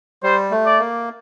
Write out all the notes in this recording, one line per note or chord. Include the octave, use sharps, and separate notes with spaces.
G3 C5
A3
D5
A#3